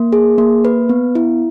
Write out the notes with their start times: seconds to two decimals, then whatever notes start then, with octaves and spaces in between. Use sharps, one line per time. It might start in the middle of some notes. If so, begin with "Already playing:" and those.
Already playing: A#3
0.13 G#4
0.38 A#3
0.65 B4
0.89 B3
1.15 E4